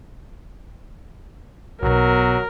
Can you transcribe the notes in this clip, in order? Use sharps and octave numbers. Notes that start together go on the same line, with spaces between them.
B1 B2 F#3 A#4